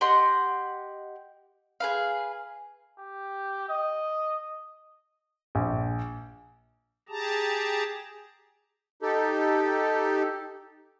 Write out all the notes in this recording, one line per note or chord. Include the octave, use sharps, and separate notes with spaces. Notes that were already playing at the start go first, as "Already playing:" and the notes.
G4 D#5 F#5 C6
G#4 B4 F5
G4
D#5
A#1
G4 G#4 A5 A#5
D#4 G4 A4